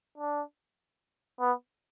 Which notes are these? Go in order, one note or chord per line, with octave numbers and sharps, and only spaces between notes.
D4
B3